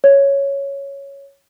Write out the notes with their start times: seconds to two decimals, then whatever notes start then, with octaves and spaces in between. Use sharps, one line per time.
0.04 C#5